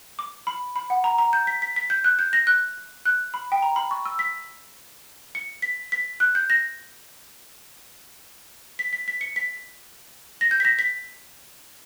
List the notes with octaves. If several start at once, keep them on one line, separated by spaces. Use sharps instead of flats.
D6
B5
B5
F#5
A#5
A#5
G6
B6
B6
B6
G6
F#6
G6
A#6
F#6
F#6
B5
G5
A#5
B5
C#6
E6
B6
C#7
B6
B6
F#6
G6
A#6
B6
B6
B6
C#7
B6
A#6
G6
B6
A#6
B6